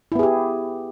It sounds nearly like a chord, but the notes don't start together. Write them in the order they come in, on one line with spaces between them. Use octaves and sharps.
E4 B3 G#4 G4